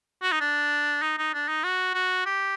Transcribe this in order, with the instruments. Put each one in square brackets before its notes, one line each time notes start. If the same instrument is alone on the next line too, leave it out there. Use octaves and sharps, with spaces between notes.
[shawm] F#4
D#4
D4
D#4
D#4
D4
D#4
F#4
F#4
G4